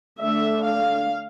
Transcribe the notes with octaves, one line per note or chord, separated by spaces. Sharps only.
D3 A3 D4 E5
F5